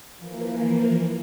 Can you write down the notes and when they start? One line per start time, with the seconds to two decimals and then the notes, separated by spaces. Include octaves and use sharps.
0.17 E3 F3 A#3